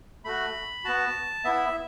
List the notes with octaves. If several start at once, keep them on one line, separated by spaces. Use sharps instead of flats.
A3 F#4 B5
B3 F#4 A5
B3 E4 E5